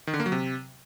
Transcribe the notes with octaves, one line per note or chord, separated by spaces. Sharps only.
D#3
D3
A#3
F#3
C3